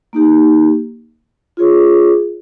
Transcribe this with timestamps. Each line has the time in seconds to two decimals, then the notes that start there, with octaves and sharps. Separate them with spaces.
0.13 A#3 D#4 G4
1.57 F4 G#4 C#5